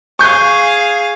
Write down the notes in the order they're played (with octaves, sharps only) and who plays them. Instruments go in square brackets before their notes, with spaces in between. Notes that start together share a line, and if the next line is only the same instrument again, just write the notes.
[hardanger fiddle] G#4 F5 [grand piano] C#6 G6